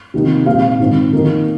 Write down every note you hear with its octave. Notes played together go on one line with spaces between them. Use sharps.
C3 D#3 A#3 D#4
A#2 G#3 C4 D#4 F5
G#2 D#3 C4
D#3 A#3 D#4 A#4